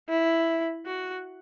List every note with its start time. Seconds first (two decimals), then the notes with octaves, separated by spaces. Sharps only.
0.09 E4
0.86 F#4